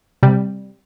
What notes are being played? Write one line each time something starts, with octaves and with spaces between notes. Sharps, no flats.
C3 G3